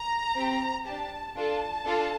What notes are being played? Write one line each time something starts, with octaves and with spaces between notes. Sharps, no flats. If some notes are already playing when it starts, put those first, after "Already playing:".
Already playing: A#5
C4 G4
D4 G4 A5
D4 F4 A4 A5
D4 F4 A4